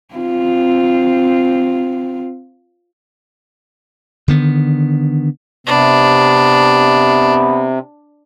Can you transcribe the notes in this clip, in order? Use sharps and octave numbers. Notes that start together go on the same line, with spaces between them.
C4 F4
D3 D#3 B3
C3 B3 D4